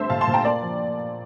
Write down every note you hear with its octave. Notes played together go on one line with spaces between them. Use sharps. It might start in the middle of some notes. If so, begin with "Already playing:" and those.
Already playing: G2 A3 C4 C5 E5
A#2 F5 A5
A5 C6
A#2
G5 A#5
A#3 D5
F3